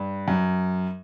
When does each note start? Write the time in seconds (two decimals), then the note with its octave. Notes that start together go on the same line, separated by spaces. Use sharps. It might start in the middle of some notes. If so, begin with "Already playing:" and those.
Already playing: G2
0.28 F#2